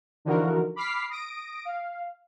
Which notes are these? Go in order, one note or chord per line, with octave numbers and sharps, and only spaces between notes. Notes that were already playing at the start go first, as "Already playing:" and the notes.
D3 E3 F3 D#4 F#4 A#4
B5 D6 F6 B6 C7
D#6 A#6 D7
F5